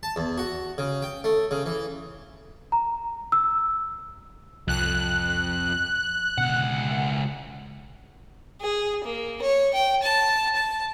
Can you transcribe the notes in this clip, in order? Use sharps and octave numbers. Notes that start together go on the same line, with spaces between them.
A5
E2
F#4
C#3
G5
A3
C#3
E3
A#5
E6
C2 F2 F#6
C#2 B2 D3 F#5
G#4
A#3
C#5
G5
A5
A5